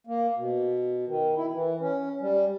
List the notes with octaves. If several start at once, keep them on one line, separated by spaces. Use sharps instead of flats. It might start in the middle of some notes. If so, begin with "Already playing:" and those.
A#3
B2
D#3
E4
E3
C#4
G3